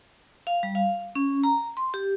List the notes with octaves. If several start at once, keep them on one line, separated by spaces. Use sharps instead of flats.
F5
G3
F5
C#4
A#5
C6
G4